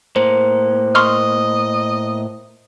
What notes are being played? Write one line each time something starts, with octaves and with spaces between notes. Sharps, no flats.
A2 A#3 C5
D#5 C6 C#6 F6